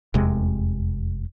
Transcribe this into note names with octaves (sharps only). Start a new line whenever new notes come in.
F1 E2 C3 G#3